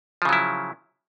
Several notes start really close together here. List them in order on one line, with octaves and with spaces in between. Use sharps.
F3 C#3 F#3 E4